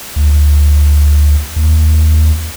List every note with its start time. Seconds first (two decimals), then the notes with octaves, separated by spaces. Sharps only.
0.16 D2
1.56 D#2